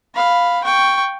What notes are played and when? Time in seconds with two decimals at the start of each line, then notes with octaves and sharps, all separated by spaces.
0.14 F5 B5
0.64 G5 C#6